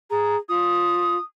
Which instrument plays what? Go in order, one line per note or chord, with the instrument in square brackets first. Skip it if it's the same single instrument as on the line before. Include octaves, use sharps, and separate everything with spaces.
[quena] G#4 [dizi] A#5
[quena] F4 [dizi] D#6